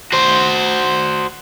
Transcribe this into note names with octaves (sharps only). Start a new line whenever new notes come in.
F#4 C5